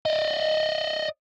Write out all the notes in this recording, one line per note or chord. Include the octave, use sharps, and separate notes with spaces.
D5 D#5